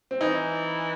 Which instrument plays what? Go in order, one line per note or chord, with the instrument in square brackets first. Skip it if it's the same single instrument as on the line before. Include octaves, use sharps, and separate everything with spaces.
[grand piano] C4
[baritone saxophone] E3 [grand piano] D#4